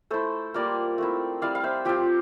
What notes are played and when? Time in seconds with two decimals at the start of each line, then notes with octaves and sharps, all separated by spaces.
0.11 A3 E4 A4 C5
0.54 G3 A#3 F4 A#4 D5
0.98 A3 C4 E4
1.42 G3 C4 E4 D5 F5
1.55 F5
1.64 C5 E5
1.85 F3 C4 F4 G4